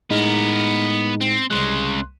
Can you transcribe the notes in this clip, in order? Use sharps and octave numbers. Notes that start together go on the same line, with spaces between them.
A2 G#3 B3 D#4 A#4
C4
C2 C#3 G#3 C6 F#6